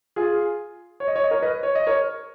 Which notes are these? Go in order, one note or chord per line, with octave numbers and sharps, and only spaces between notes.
F4 G#4
C#5
D#5
C#5
D#5
A#4 C#5
B4 D#5
C#5
D#5
A#4 C#5